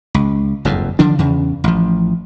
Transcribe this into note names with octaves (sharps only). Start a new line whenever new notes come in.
C#2
F#1 F2 G#2
D3 F3 D4
E2 C#3
A1 F3